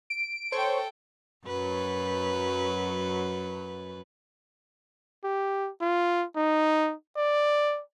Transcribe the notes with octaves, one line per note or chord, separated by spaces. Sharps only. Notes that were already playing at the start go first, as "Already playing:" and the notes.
D7
A4 C5 C#5 G5 C#6
F#2 F#3 B4
G4
F4
D#4
D5